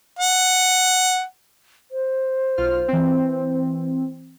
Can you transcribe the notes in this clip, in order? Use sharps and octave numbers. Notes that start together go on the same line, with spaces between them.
F#5
C5
B1 F4 F6
E3 C4